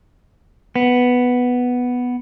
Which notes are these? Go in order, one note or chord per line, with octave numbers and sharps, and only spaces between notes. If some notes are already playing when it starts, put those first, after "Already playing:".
B3